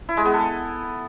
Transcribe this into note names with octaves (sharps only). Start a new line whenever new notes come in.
E4
G#3
B3
A4